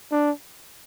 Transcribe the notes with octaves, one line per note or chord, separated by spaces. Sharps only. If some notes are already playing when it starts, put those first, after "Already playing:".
D4